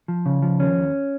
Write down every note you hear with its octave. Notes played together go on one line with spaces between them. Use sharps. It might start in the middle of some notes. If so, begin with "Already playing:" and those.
F3
C#3
F3
D#2 C#4
D#2